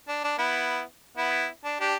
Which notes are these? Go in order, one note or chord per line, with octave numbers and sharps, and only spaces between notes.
D4
D4
B3 E4
B3 E4
D4
D4 G4